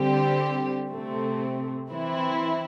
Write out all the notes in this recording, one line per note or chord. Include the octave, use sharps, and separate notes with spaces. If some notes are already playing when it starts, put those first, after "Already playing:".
Already playing: D3 G3 C4 G4
C3 A3 C4
E3 C4 E4